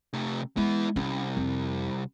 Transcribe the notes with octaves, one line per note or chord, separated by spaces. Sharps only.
C3 A3
G#3 B3 E4
C2 C#4
F2